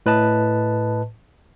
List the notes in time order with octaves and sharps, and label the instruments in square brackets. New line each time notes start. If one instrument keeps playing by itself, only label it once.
[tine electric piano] A2 B4 D#5 A5